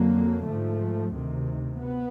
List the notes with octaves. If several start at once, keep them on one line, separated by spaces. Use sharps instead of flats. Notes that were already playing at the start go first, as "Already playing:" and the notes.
Already playing: F2 D3 F#3 A#3
G#2 F3 A3
D2 C3 D#3
B3